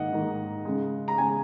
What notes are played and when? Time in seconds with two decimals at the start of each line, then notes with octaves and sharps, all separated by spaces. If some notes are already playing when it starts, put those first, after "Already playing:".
Already playing: G#2 D#3 A#3 D#5 F#5
0.13 G#2 D#3 A#3
0.65 C#3 G#3
1.08 A#5
1.18 C#3 G#3 G#5